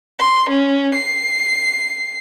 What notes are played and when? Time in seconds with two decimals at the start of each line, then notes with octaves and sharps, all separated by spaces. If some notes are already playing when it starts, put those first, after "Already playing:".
0.19 C6
0.49 C#4
0.94 C7